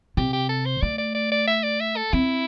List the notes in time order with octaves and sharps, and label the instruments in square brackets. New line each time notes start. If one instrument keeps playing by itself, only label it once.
[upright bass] C3 [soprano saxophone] G4
[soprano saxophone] G4
A4
C5
[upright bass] A3 [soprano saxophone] D5
[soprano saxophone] D5
D5
D5
E5
D5
E5
A4
[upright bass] C4 [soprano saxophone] E4